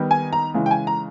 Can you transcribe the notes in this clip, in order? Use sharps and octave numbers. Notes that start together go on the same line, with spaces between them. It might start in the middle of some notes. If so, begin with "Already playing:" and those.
Already playing: D#3 G3 B3 D#4
G#5
A#5
C#3 E3 G#3
G5
G#5
A#5